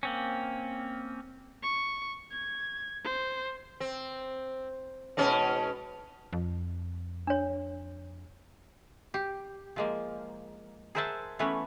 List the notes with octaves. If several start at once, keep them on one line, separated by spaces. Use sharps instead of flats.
A#3 C4 C#4
C#6
G#6
C5
C4
G#2 B2 C#4
F2
D4 C#5
G4
F3 G#3 A#3
G#4 A#4 C5 E5 F#5 A5
E3 A3 B3 C#4 B4 C#5